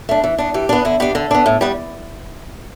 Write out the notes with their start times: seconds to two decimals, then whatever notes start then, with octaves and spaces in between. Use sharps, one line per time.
0.09 A3 D4
0.24 E3
0.38 B3 D4
0.54 E3 G4
0.69 B3 D4
0.85 D3 E4
1.00 B3 D4 G4
1.15 D3 A4
1.31 B3 D4
1.46 A2
1.61 G3 B3